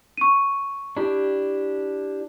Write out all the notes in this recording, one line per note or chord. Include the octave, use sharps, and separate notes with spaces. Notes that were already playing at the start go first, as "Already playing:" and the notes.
C#6 D#7
D4 E4 G4